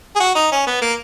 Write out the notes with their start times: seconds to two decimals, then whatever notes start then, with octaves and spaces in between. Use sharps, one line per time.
0.16 G#4
0.20 F#4
0.35 D#4
0.52 C#4
0.67 B3
0.82 A#3